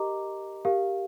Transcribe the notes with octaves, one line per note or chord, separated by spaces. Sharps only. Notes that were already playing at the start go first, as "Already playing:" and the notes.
Already playing: G4 A#4 D#5 A#5 D6
G4 A#4 F5